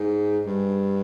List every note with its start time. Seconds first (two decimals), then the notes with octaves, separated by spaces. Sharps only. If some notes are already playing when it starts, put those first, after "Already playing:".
Already playing: G#2
0.46 G2